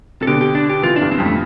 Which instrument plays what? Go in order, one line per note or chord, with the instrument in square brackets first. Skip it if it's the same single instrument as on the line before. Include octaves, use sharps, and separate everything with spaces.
[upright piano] C3 [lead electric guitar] A4
[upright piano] B2 D3 [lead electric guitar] G4
[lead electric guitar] G4
D4
G4
[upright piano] C3 E3 [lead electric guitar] F4
[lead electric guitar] D4
[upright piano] G2
[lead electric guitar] C4
[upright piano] F2 [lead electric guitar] G3
[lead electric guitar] A3